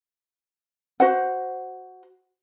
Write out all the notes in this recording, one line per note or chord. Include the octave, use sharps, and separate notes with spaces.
F#4 C5 F#5